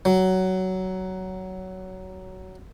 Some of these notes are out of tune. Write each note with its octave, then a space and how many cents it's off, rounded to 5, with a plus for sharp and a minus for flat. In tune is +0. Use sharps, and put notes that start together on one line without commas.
F#3 +15